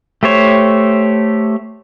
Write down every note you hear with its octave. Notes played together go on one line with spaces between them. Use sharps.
A3 G4 C5 C#5